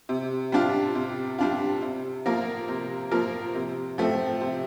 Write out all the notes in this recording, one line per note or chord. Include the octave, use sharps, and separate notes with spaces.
C3
G3 D4 F4
C3
G3 D4 F4
C3
F3 A#3 F4 A#4
C3
F3 A#3 F4 A#4
C3
F3 A3 C4
C3